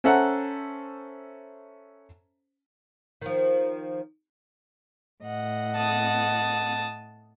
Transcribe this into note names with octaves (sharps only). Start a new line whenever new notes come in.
C#4 A4 C5 E5 F#5 A#5
D#3 F3
A2 D#5 F#5
A5 D#6